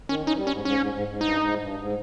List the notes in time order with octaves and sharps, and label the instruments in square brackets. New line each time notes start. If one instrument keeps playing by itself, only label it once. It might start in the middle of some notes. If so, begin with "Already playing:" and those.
[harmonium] D#3 [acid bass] C#4
[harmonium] C#4 [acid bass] D#4
[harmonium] E3
G3
[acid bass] C#4
[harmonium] G#2
[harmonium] G#2 [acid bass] C#4
[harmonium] G#2
G#2
G#2
[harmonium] G2 [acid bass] D#4
[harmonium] G#2
G2
G#2